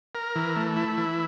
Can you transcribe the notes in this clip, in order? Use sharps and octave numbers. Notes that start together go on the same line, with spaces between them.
A#4
E3
A3
E4
E3